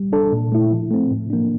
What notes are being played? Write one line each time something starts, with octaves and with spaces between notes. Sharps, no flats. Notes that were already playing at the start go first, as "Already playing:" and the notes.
Already playing: G3
D4 A4
A#2
A3 E4
F3
A3 C4
A2
F3 A#3 D4